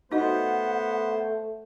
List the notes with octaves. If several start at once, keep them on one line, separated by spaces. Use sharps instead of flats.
A3 B3 D#4 F#4 C5 D#5 F#5